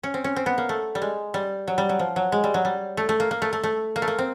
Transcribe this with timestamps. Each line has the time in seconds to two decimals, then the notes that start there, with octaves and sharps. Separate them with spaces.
0.03 C#4
0.14 C4
0.24 C#4
0.36 C4
0.46 B3
0.58 A#3
0.69 A3
0.95 G3
1.02 G#3
1.34 G3
1.67 F#3
1.78 G3
1.89 F#3
1.99 F3
2.16 F#3
2.32 G#3
2.44 G3
2.54 F#3
2.65 G3
2.97 A3
3.09 A3
3.20 A#3
3.31 A#3
3.42 A3
3.53 A3
3.63 A3
3.96 A#3
4.02 A3
4.08 A#3
4.18 C4